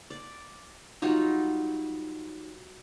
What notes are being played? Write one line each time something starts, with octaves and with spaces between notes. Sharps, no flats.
D5
F#3 G3 D#4 F4